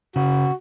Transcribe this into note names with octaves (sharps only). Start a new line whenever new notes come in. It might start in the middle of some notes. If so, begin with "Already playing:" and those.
C#3 F#4